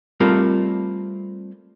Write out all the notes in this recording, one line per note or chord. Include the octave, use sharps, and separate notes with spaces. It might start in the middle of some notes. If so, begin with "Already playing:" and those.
G3 A3 C4 F4 A#4